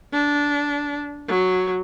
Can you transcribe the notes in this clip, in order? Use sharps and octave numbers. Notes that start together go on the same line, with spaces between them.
D4
F#3